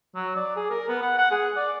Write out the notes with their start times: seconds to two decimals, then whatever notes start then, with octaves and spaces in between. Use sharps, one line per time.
0.15 F#3
0.36 D5
0.56 G#4
0.70 A#4
0.89 B3
1.02 F#5
1.18 F#5
1.31 G#4
1.56 D5